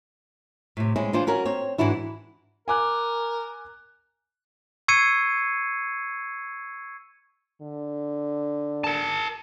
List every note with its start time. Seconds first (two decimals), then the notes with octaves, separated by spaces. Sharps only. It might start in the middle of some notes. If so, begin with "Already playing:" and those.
0.77 A2 C3
0.96 G#3 C4 C#4 E4
1.13 E3 D4 F4 C5
1.27 C#4 F#4 A#4
1.45 C4 C#5
1.78 G#2 D#3 E3 D4 E4 F#4
2.68 A#4 G#5 D6 F#6
4.88 C#6 E6 G#6 C7 C#7 D#7
7.62 D3
8.84 A#4 A5